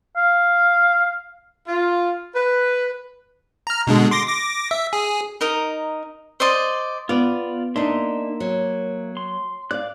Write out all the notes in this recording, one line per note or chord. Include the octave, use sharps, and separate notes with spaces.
F5
F4
B4
A#5 F6
B2 D3 G#3
C6 D6 A#6
D6 A#6
E5
G#4
D#4 A#4 D#5
C5 D5 D#5 C6
B3 F4 D5
A#3 D4 D#4 E5 C6
F#3
C6
D5 F5 F#6